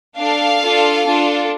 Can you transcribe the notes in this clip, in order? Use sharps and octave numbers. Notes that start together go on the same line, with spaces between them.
D4 A4 F5
D4 F4 A4
D4 F4 A4